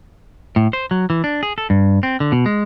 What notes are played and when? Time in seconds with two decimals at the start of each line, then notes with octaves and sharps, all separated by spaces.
0.56 A2
0.73 C5
0.91 F#3
1.10 E3
1.24 D4
1.43 G#4
1.58 A4
1.70 G2
2.03 C4
2.20 D3
2.32 B2
2.46 G#3